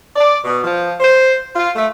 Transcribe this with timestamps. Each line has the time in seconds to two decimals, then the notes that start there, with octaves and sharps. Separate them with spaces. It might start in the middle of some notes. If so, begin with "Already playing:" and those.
0.16 D5
0.45 B2
0.64 F3
1.00 C5
1.56 F4
1.76 A3